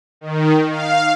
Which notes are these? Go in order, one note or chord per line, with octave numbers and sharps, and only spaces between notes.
D#3
F5